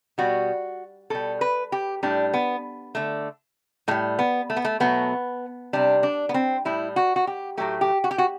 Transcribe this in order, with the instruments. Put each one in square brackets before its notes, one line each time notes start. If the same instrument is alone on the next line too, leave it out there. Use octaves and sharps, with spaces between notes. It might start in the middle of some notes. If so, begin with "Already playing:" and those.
[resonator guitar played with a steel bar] B2 G3 F#4
B2 G3 A4
B4
G4
A2 G3 D4
B3
D3 A3
A2 A3
G3
B3
A3
B3
A3
B2 F#3 A3 B3
C3 G3 D4
D4
B3
C4
A2 G3 E4
F#4
F#4
G4
A2 F#3 A3 G4
G4
F#4
G4
F#4